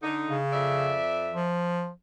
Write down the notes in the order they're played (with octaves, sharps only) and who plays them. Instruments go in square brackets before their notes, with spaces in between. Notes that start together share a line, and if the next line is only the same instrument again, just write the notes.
[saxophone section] D3 D#4
[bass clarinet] C#3
[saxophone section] F2 D5 E5
[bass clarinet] F3